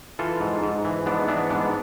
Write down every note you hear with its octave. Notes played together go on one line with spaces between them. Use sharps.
E3 F4 A4
G#2
G#2
E3
G#2 B3 D4
E3 B3 D4
G#2 B3 D4